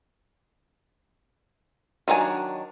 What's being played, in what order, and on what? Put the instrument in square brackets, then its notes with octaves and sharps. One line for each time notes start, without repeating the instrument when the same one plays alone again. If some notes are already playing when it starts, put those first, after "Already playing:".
[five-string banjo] D#3 F#3 D4 G#5